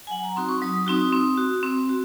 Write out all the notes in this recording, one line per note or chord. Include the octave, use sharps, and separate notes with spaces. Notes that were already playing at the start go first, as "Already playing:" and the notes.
G#5
F#3 F#5
A#5
C4 D#4 F#4 C6
C#6
F#3 D#6
C4 D#4 F#4
C4
F#4
C4
F#4